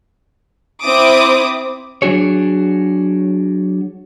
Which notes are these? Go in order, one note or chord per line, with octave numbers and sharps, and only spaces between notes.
C4 E4 D6 D#6
F#3 D4 F#4 G#4 C#5